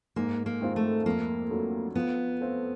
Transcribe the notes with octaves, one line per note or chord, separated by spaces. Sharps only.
G#2 A#3
A#3
D#3 G#3 C4 F4
A3
F2 A#3
D3 F#3 A3
F3 B3
A3 C4 F4